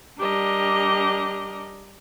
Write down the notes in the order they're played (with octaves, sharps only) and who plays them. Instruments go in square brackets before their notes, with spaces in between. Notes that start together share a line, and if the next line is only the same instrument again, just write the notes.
[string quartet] G3 D4 G4 A#4 D#5